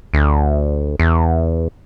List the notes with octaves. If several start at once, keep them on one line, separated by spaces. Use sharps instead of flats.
D2
E2